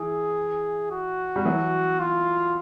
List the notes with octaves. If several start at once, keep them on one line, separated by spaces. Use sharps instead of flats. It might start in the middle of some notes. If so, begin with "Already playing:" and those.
Already playing: E3 G#4
F#4
G3
E3 F#3
F4